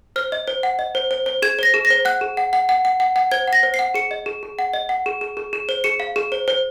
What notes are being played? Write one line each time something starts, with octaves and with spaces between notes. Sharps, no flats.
C5 F6
D#5
C5
F#5
D#5
C5
C5
C5
G#4 G#6
C5 A#6
G#4
A#6
C5
F#5 F#6
G#4
F#5
F#5
F#5
F#5
F#5
F#5
C5 G#6
F#5
A#6
C5
C7
F#5
G#4 C#7
D#5
G#4
G#4
F#5
D#5
F#5
G#4
G#4
G#4
G#4
C5
G#4 C#7
F5
G#4
C5
C5